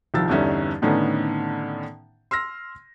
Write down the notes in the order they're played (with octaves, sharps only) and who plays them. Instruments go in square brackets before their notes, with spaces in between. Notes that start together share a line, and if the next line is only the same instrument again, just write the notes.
[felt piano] C2 D#3 F3 E6 A6
E2 G2 D3 C#4 D#4 E5
A2 D3 D#3 B3 C#4 D#4
C6 E6 F6 A#6